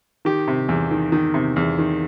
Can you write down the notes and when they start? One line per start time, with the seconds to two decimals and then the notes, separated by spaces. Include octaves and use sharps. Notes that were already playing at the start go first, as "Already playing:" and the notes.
0.25 D#3 G4
0.48 C3
0.69 E2
0.91 D#3
1.12 D#3
1.34 C3
1.56 E2
1.78 D#3